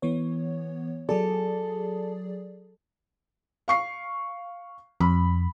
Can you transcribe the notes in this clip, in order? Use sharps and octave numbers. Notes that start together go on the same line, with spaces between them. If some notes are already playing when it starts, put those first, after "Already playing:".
E3 B3 C#5
F#3 G#4 A4 D5
F5 C#6 C7
F2 B5